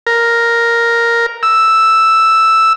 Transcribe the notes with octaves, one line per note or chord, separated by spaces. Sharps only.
A#4
E6